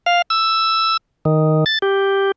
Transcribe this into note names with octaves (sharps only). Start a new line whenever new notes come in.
F5
E6
D#3
A6
G4